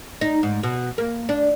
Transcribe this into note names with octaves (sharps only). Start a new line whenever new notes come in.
D#4
G#2
B2
A#3
D4